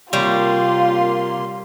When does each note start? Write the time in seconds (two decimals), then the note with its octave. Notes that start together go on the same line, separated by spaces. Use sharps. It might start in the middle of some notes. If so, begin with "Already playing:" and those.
0.13 C3 G3 A#3 F4 C#5 C6